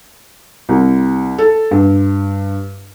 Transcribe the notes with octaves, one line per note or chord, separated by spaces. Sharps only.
C2
A4
G2